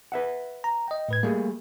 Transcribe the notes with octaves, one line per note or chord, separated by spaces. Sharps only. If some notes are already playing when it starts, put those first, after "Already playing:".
B4 E5 F#5
A#5
D#5 G5
A2 B4 G#6
G3 A3 A#3 G#4